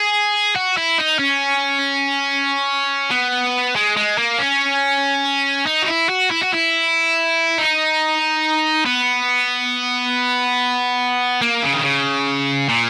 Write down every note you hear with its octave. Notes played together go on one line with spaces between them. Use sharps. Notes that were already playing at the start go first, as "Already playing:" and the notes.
Already playing: G#4
F#4
E4
D#4
C#4
B3
G#3
G#3
A#3
C#4
D#4
F#4
E4
F#4
E4
F#4
E4
D#4
B3
A#3
C#3
D#3
C#3
A#2